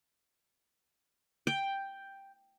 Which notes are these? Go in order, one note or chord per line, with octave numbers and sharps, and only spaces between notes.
G5